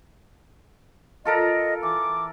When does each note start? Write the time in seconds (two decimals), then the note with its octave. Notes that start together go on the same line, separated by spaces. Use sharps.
1.25 F4 A4 A#4 D#5
1.83 E3 D6